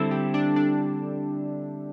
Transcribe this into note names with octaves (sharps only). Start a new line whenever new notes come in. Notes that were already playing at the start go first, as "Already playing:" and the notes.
Already playing: D3 G3 C4 E4 A4
G4
D4
D4